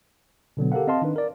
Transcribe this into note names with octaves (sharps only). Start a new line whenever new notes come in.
B2 D3 F#3 B3
G4 A4 A#4 F5 F#5
C4 D#5 F5 A5 C6
D#3 D4 D#4 B4
A#4 D5